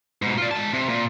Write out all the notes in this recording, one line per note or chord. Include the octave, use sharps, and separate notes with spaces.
G#2 B2
F4 D5
G#3 A5
C3
A#2